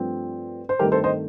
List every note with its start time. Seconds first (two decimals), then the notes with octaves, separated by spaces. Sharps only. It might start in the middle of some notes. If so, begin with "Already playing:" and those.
Already playing: G2 F3 A3 C4
0.69 C5
0.79 G2 D#3 A3 C4 G4 A#4
0.92 A4 C5
1.04 C5 D#5